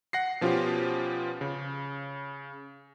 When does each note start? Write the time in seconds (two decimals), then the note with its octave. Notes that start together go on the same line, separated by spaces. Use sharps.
0.13 F#5 A#6 C7
0.41 B2 F3 C#4 F4 G4
1.41 C#3